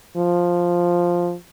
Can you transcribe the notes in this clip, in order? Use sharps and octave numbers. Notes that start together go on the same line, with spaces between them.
F3